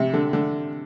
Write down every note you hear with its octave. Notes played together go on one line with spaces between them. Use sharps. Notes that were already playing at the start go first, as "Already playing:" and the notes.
Already playing: C3
D3
D3